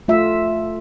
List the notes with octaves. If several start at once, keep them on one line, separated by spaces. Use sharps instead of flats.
A3 F4 E5